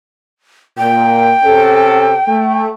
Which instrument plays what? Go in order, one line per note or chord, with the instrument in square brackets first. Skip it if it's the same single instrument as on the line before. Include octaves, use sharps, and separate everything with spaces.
[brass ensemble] A#2 [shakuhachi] G5
[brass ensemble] C3 C#4 A4
A3